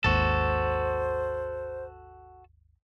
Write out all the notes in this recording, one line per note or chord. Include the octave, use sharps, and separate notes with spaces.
G#1 D#2 F#4 A4 C5